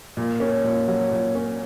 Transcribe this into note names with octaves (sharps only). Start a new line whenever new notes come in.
A#2
C#4
A#2
F#3
A#2
C#4